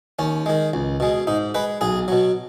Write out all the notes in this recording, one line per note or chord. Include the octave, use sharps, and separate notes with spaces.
D#2 C#4
D#3 G#3
C#2
B2 G#3
G#2 D#4
G#3 B4
B1 G#4
B2 F#3